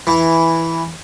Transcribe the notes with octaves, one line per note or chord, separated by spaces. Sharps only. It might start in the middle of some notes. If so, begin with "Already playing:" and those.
E3